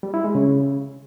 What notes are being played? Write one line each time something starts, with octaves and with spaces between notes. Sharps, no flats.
G3
E4
G#3
C#3